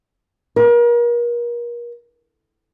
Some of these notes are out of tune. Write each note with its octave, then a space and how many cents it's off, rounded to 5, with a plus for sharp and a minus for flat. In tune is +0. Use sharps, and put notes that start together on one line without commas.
A#4 +35